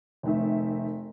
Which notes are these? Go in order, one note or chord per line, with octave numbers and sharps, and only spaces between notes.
F1 D#3 E5